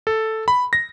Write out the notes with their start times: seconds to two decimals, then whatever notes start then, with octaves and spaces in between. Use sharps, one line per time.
0.07 A4
0.48 B5
0.73 A#6